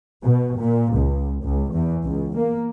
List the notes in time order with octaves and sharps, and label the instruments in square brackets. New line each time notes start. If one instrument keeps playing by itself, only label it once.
[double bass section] B2
A#2
C#2
C#2
E2
C#2
A#3